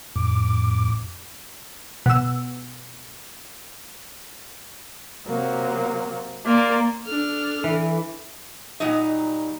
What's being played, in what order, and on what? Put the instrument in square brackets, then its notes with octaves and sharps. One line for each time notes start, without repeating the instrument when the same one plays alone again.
[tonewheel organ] F2 A2 D6
[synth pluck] B2 E6
[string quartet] C3 F#3 A#3
[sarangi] A#3 [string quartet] A#4 D5 C6
[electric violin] D4 F6 [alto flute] A4
[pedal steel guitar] E3
[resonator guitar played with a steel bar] A#2 F#3 G3 D#4 D#5